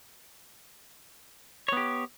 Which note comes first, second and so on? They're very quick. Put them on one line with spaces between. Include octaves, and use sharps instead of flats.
C#5 B3 G4